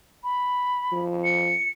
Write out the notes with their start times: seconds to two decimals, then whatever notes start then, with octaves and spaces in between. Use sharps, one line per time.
0.24 B5
0.92 F3
1.25 C#7